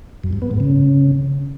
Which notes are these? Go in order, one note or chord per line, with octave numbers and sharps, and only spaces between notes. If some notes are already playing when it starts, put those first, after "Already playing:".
F#2
G2
B3
G#2
C#3